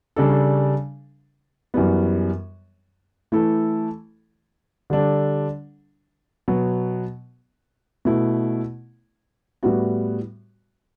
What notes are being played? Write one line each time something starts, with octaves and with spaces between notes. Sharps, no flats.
C#3 G3 D4 A4
F#2 E3 G3 B3
E3 A3 E4 A4
D3 G3 D4 A4
B2 F#3 B3
B2 A3 E4
A2 G3 B3 F#4